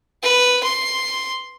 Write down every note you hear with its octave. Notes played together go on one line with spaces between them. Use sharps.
B4
C6